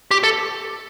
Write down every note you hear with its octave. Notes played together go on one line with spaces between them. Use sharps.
G4
A4